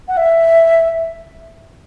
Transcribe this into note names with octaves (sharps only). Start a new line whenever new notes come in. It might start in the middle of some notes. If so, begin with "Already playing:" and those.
F#5
E5